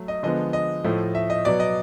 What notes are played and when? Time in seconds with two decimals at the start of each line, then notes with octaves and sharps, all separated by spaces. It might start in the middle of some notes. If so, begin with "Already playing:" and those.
Already playing: F#3 A3
0.08 D#5
0.23 D3 F3 G#3 B3 D#5
0.53 D#5
0.84 A2 F3 A3
1.15 E5
1.30 D#5
1.45 B2 F#3 B3 D5
1.60 D#5